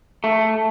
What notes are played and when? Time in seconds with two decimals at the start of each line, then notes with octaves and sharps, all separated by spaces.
0.24 A3